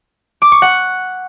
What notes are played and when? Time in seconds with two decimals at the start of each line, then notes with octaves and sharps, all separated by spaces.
0.42 D6
0.52 C#6
0.62 F#5